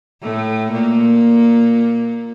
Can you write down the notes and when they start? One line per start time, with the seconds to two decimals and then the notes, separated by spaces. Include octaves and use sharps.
0.22 A2 A3
0.72 A#2 A#3